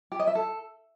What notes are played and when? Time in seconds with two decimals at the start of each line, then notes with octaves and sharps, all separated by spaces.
0.12 G4
0.20 D#5
0.27 E5
0.35 A4